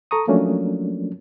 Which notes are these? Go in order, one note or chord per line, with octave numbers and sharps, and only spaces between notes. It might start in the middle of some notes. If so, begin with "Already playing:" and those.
A4 A#5 C#6 D#6
F3 F#3 A3 A#3 C#4 D4